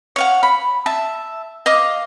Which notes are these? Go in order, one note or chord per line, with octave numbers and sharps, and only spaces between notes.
C#5 F5 F#5
B5
E5 A5
D#5 F5 D6